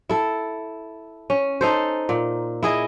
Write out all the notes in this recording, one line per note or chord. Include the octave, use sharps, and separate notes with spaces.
E4 A4
C#4
D#4 A4 C5
A#2
E4 G#4 D#5